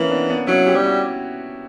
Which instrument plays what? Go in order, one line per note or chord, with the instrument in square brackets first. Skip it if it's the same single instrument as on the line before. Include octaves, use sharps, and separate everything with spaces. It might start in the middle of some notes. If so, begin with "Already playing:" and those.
Already playing: [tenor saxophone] E3 [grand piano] A#3 C#4
[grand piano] B3 D4
B3 D4
[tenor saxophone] F#3 [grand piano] C#4 E4
[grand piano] E4 G4
[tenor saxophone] G3
[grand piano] F#4